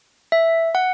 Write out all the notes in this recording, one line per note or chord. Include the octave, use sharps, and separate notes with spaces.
E5
F#5